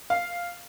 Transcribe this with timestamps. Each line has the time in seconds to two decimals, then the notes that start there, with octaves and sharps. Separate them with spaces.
0.10 F5